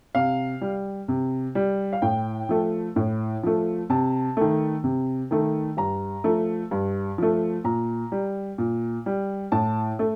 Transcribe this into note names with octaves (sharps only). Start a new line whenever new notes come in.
C3 F5
G3
C3
G3
F5
A2 G5
F3 A3
A2
F3 A3
C3 A5
D#3 A3
C3
D#3 A3
G2 A#5
F3 A3
G2
F3 A3
A#2 A#5
G3
A#2
G3
A2 A5
A3